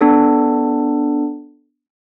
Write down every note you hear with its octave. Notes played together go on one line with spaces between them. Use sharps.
B3 D4 A4